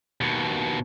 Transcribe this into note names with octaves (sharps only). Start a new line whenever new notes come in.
D#2 B2